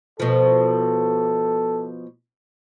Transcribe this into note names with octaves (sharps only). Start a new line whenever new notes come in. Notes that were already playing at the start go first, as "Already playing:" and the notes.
B2 F3 A4